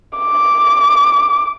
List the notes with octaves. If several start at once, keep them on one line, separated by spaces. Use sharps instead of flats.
D6